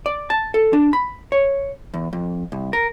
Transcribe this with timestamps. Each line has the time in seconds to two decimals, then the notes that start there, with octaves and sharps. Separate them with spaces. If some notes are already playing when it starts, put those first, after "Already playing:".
0.06 D5
0.30 A5
0.54 A4
0.73 D4
0.93 B5
1.32 C#5
1.94 E2
2.13 F2
2.52 C2
2.73 A#4